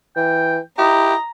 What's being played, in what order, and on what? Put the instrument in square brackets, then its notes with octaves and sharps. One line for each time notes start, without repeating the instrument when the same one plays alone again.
[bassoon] E3 [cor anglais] G5
[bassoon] E4 [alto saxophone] G4 [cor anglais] D#5 [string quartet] A#5